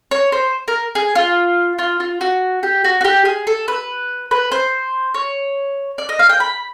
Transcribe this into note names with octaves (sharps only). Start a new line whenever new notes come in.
C#5
C5
A#4
G#4
F4
F4
F4
F#4
G4
F#4
F#4
G4
G#4
A4
B4
B4
C5
C#5
D5
D#5
F5
G5
B5